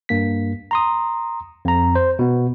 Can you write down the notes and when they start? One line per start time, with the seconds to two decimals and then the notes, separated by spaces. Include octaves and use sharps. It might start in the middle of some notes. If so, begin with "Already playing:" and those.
0.09 G2 A#3 B6
0.71 A#5 C6 D#6
1.65 F2 A#5
1.95 C5
2.19 B2 B3